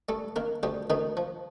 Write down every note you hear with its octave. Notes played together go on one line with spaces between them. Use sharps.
G3 A3 A4
D#3 A#3 A#4
D2 G3 G4
D2 D#3 D#4
F3